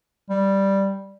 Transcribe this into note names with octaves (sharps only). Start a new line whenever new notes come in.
G3